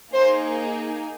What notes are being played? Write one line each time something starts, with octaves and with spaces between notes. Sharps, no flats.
A#3 D#4 G#4 C5